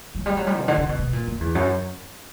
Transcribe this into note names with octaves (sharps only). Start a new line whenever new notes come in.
F#3
G3
F#3
G3
B2
D3
C#3
B2
B2
A#2
F#2
E2
F#2